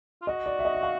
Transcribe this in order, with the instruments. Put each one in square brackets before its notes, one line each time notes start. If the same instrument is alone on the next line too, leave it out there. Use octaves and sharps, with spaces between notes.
[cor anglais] F4
[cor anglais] F#4 [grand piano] D#5
[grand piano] D5
E5
D#5
E5
F5